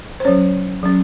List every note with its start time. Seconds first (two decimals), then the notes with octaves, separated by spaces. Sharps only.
0.20 C5
0.25 F#3 C#4 C#5
0.83 F#3 C#4